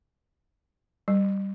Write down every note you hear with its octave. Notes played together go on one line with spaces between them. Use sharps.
G3